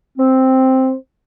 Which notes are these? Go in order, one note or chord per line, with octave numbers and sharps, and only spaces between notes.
C4